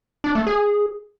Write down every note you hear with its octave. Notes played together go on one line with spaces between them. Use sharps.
D4
A3
G#4